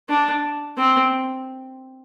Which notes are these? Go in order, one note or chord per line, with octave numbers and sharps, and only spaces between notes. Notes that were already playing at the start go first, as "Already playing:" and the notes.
D4
C4